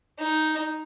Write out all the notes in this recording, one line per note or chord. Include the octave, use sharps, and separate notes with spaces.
D#4